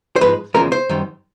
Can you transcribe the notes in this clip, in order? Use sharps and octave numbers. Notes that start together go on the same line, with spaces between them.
C5
G#2 F3 G#3 B4
E2 C#3 F3 G#3 A#4
C5
F#2 D#3 G3